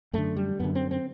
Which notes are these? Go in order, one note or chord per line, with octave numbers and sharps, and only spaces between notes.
F#2 D3 A3
G3
F#2 D3 B3
C4
C4